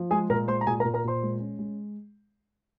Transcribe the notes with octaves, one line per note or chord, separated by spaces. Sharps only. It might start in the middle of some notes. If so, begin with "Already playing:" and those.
Already playing: F3
G#3 G#4 G#5
A#2 A#4 A#5
G#3 C5 C6
A#5
A#2 G#4 G#5
A#4 A#5
A#2
A#4 A#5
A#2 C5 C6
G#3
C#4
G#3